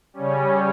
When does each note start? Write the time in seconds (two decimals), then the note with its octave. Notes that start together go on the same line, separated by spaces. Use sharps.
0.13 C#3 G3 C#4